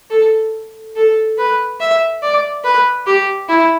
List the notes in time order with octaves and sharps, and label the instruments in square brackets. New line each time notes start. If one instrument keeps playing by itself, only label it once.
[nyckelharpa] A4
A4
B4
E5
D5
B4
G4
E4